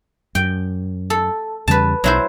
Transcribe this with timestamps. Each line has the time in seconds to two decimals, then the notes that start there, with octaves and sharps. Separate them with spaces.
0.35 F#2 G5
1.10 A4
1.68 E2 C#3 G3 B4 A5
2.04 B1 F#3 E4 C5